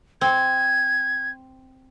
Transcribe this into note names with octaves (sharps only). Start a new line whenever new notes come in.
C4 G#6